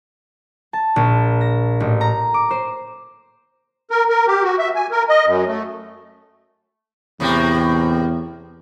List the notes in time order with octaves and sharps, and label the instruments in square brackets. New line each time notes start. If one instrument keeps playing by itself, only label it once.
[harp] A5
A#1
A#6
A1
A#5
D6
C5
[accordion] A#4
A#4
G4
F#4
E5
G#5
A#4
D#5
F#2
A3
[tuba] E2 [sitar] A2 C3 A#3